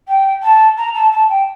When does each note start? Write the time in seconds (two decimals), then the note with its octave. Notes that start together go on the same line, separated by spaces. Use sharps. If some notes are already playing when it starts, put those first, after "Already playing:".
0.08 G5
0.43 A5
0.78 A#5
0.94 A5
1.12 A5
1.29 G5